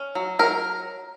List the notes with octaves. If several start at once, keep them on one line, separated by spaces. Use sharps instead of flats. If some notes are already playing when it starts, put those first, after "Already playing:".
Already playing: C#4
F#3
F#3 A#4